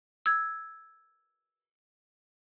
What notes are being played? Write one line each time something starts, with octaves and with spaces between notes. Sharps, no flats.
E6 G#6